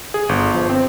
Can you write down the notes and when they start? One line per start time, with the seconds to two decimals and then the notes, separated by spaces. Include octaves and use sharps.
0.14 G#4
0.29 G1
0.54 F3
0.69 C4